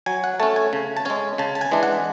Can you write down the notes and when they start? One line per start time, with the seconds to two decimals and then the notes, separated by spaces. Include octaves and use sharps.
0.06 F#3 G#5
0.24 F#5
0.40 A3 C#4 A5
0.56 G#5
0.73 C#3
0.97 A5
1.05 G#3 C#4 G#5
1.38 C#3 A5
1.55 A5
1.61 G#5
1.71 E3 G#3 D4
1.83 F#5